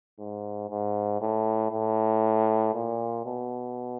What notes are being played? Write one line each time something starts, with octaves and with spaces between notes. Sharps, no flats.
G#2
G#2
A2
A2
A#2
B2